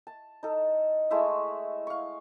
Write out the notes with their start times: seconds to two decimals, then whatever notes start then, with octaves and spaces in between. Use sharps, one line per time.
0.07 A5
0.43 D#4 A4
1.11 G#3 A3 E4 E5
1.87 F5 C#6